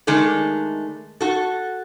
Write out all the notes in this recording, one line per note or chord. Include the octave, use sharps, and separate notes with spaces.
D#3 G#3 A3 D4 A4
F#4 A4